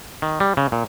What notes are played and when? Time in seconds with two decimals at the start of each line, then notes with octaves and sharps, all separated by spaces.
0.22 D#3
0.40 G3
0.57 C#3
0.72 A#2